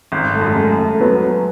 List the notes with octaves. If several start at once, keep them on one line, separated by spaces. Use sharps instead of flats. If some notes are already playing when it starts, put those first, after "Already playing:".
G#1
A3
F#2
A3
G#3
F#2
A3
F#3 B3
B3